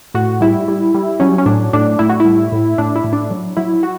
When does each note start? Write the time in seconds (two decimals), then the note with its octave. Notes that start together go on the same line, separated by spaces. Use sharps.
0.14 A2 F#4
0.41 G3 E4
0.68 G3
0.95 G3
1.20 F#3 C#4
1.38 C#4
1.46 A2 D4
1.73 A2 D4
1.99 A2 E4
2.09 F#4
2.20 G3 E4
2.52 A2
2.78 A2 D4
2.96 E4
3.04 A2
3.13 D4
3.30 F#3
3.57 F#3 E4
3.83 F#4